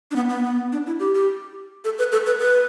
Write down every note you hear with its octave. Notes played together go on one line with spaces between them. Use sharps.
D4
B3
B3
B3
D4
E4
G4
G4
A4
B4
A4
B4
B4